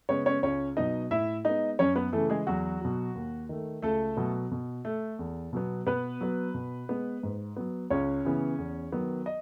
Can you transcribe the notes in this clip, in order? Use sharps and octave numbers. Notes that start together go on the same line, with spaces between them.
C#3 G#3 B3 C#4 C#5
C#4 C#5
C#2 C#4 C#5
B2 F#3 B3 D#4 D#5
A2 E4 E5
G#3 B3 D#4 D#5
F#2 C#4 C#5
B3 B4
C#3 E3 A3 A4
G#3 G#4
E2 F#3 F#4
B2 F#3
D#2
D#3 A3
C#2 A3 A4
B2 F#3 B3
B2
A3 A4
E2
B2 F#3 B3
B2 B3 B4
F#3 B3
B2
G#3 B3
G#2
F#3 B3
C#2 C#4 C#5
C#3 E3 B3
E2
D#3 F#3 B3
D#5